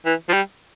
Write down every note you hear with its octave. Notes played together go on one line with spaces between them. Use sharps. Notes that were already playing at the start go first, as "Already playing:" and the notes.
E3
F3
G3